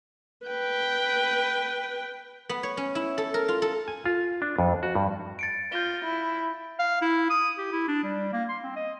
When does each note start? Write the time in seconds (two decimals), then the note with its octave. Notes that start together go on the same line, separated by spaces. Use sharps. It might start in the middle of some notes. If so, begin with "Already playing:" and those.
0.47 B4 G5
2.49 B3
2.63 C#5
2.77 C#4
2.95 E4
3.18 A4
3.34 A#4
3.48 F4
3.62 A4
3.88 G#5
4.06 F4
4.42 D4
4.59 F2
4.83 F#4
4.95 G2
5.39 A6 C#7 D7
5.72 F4 G6 A#6 G7
6.05 E4
6.79 F5
7.01 E4
7.30 D#6
7.58 G4
7.72 E4
7.88 D4
8.03 G3
8.33 A#3
8.49 C6
8.63 C4
8.76 D#5